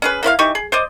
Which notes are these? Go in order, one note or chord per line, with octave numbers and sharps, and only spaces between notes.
C#4 G#4 B4
A#3 E4 C5 F5
E3 D#4 G4 C#6
G#4
C5 D5 D#5